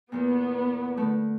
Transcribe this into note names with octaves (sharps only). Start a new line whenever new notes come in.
E2 A#2 B3
D3 A3